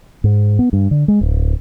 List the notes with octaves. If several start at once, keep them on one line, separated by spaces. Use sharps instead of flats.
G#2
B3
G2
D3
G#3
D1